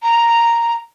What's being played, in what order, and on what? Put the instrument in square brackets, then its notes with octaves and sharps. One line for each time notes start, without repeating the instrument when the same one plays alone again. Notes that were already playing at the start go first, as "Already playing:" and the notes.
[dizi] A#5